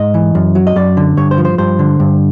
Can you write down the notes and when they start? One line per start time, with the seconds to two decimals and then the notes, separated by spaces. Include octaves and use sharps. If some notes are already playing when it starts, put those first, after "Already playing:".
Already playing: G#2 D#5
0.14 E3
0.35 F#2
0.55 F#3
0.67 D#5
0.76 F#2 D5
0.97 D3
1.17 G2 C#5
1.31 C5
1.38 F3
1.45 C5
1.58 G2 C5
1.79 D3
2.00 G2